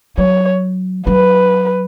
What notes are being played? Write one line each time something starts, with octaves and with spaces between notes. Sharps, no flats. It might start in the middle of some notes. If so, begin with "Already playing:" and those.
F#3 C#5
F#3 B4